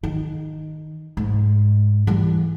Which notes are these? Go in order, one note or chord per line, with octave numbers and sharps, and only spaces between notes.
D#3
G#2
E3 G3